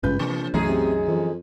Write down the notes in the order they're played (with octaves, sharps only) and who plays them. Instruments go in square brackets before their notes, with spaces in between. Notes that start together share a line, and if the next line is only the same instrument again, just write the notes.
[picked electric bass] G#1 G2 C#3 [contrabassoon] C#2 [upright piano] B4 G6
[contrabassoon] A#1 [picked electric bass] C3 [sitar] E3 B3
[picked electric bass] C2 E3 A3 [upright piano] F#2 [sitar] D#4 G#4
[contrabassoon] C3
[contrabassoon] F2 [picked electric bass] E3